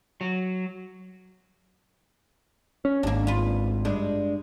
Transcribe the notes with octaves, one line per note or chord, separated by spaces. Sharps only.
F#3
C#4
G#1 G#2 A#3 D4
F4 B4
G2 G#3 D4